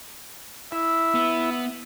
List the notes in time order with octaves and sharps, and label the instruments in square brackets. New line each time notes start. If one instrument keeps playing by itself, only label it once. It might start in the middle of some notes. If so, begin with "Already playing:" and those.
[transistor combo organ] E4 [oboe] E5
[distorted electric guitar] B3